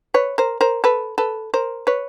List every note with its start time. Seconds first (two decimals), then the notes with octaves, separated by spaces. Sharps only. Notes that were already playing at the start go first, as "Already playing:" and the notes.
0.14 B4 C#5
0.38 A#4 C5
0.61 A#4 C5
0.84 A4 B4
1.18 A4 B4
1.54 A#4 C5
1.87 B4 C#5